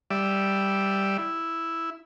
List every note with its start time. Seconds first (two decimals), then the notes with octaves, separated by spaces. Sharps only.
0.10 G3 D5 E5
1.18 E4